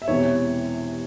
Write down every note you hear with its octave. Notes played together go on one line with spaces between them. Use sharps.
E5
E1 E2 C3 E3 C#5